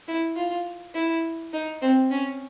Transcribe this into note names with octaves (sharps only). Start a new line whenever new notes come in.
E4
F4
E4
D#4
C4
C#4